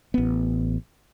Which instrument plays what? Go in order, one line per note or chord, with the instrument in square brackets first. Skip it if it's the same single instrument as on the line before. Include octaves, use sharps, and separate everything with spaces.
[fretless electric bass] A1 B3